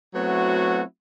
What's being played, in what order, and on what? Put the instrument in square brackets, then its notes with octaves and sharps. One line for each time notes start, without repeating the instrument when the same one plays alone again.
[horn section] F#3 A3 B3 C4 E4 F#4